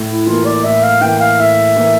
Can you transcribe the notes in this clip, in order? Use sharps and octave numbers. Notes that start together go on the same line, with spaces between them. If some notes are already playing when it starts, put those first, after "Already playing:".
Already playing: A2
E4
E3 A#3 F4
D5
A2 E5
F5
E3 A#3 G5
F5
A2 E5
E3 A#3